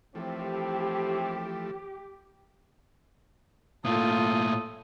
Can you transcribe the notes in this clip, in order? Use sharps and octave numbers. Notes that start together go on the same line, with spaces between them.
D#2 A2 E3 F3 A3 C4 G4
A2 A#3 F4 A4 D#6